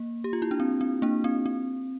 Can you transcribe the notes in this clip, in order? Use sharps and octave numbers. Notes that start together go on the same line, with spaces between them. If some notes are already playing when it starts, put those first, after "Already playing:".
Already playing: A#3
G4
F4
E4
D4
C4
C4
A#3 D4
C4
C4